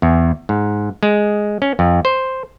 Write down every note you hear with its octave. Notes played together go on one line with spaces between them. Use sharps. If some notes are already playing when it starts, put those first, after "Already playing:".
E2
G#2
G#3
C#4
F2
C5